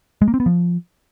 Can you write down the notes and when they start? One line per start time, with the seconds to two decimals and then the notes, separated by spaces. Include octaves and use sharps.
0.22 G#3
0.28 A#3
0.34 C4
0.40 B3
0.46 F3